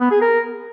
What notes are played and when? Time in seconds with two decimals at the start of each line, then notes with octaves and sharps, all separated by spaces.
0.01 B3
0.11 G#4
0.21 A#4